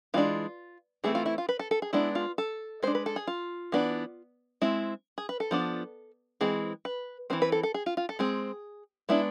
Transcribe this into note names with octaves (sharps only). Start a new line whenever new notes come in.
E3 G#3 D4 F4
E3 A3 C4 G#4
F4
E4
F4
B4
A4
A4
G#4
G#3 B3 D4 E4
F4
A4
G#3 D4 C5
B4
A4
G#4
F4
E3 B3 D4
G#3 C4 E4
G#4
B4
A4
F3 B3 D4
E3 G#3 C4 G#4
B4
E3 A3 C4 C5
B4
A4
A4
G#4
F4
F4
A4
G#3 C4 G#4
G#3 B3 D4 E4